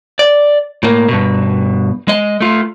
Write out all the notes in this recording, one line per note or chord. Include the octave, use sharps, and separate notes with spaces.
D5
A2 A#3
G2 B2
G#3 D#5
A3 F4